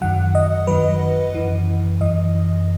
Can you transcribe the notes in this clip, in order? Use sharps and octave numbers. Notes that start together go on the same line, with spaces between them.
F#2 D#3 F#3 F#5
D#5
F#2 D#3 F#3 B4
F#2 E3
F#2 E3 D#5